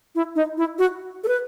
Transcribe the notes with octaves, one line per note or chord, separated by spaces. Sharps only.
E4
D#4
E4
F#4
A4
B4